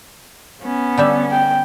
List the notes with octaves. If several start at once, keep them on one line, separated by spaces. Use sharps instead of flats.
B3 C#4
D3 G3 E5
G5